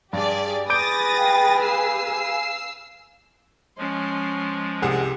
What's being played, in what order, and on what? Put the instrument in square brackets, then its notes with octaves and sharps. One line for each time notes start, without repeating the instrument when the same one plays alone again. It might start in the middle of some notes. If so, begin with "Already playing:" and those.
[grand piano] G2 [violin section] G4 G#4 D5
[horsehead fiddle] G#4 B4 [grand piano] D6 G6 D7 [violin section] D#6 A6 A#6
[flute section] F5 G5
[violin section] F5 E6 C7 [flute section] G#5
[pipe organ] F3 G#3 [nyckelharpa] C#4 C6
[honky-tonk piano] C2 C3 [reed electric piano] G#4 F#5